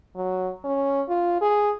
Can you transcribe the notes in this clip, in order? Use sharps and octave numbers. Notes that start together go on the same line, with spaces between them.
F#3
C#4
F4
G#4